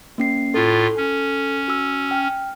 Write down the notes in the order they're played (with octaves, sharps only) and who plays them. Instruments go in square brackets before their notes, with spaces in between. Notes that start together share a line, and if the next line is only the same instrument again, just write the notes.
[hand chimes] A#3 C#4 C7
[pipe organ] A2 F4 [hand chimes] A4
[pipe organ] C#4
[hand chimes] F#4 E6
G5 F6